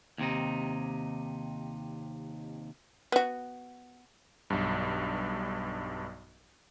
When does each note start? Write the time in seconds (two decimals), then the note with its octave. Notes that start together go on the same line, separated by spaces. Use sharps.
0.18 D#2 C3 D#4
3.12 B3 F#4
4.50 B1 G2